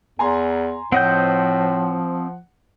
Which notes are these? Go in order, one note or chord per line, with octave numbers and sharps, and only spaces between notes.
E2 G#5 A#5 C6
A2 F3 C4 D#5 F#5 G6